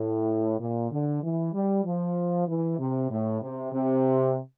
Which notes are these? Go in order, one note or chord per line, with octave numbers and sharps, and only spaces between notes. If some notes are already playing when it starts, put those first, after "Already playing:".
Already playing: A2
A#2
D3
E3
G3
F3
E3
C3
A2
C3
C3